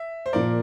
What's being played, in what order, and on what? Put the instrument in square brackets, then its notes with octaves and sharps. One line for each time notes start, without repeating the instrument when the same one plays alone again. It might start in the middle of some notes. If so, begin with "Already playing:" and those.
Already playing: [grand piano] E5
C5
[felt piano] A#2 F3 A#3 [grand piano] A#4 D5